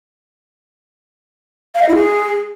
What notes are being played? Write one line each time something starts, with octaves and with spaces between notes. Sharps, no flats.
F5
D#5
E4
G#4